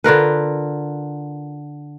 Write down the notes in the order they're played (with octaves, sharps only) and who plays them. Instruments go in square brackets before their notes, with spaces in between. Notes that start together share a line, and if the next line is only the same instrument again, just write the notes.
[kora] D3 F4 A#4 B4